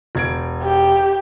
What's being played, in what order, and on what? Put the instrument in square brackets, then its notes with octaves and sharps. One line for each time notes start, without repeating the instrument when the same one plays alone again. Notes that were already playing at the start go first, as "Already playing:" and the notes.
[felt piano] E1 G#6 D7
[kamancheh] G4